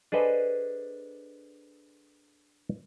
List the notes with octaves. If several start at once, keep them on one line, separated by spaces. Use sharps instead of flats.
D4 G#4 A4 B4 C5 D#5